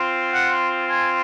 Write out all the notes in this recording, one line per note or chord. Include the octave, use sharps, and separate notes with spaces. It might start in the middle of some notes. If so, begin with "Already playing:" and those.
Already playing: C4 F4
F#5
G#5